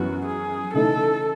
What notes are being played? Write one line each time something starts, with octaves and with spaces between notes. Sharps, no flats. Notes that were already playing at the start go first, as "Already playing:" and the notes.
Already playing: F#2 E3 B3 F#4
G#4
C#3 E3 A3 D#4 A4